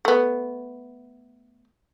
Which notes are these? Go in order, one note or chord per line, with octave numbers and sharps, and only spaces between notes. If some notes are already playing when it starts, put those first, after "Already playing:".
A3 B3